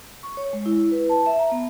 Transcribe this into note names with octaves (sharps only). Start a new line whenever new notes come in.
C#6
C#5
G#3
E4
B4
A5
E5
A#5
B3